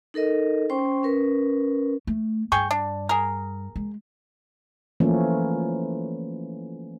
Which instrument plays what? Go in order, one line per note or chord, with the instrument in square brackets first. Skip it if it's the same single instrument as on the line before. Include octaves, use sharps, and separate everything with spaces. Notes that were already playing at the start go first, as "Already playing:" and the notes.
[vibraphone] D#4 A4 A#4 D#5
C#4 C5 G5 C6 C#6
C#4 A#4 B4
[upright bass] A3
[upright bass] G2 [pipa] G#4 G5 C#6
[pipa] D4
G#4 A#4
[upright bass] G#3
[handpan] E3 F3 A3 A#3 C#4